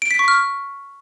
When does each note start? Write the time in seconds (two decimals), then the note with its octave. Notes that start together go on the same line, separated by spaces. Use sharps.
0.02 D7
0.11 B6
0.19 C#6
0.28 F6